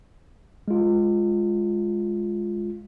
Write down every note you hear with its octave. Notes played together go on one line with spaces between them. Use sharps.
G#3 F4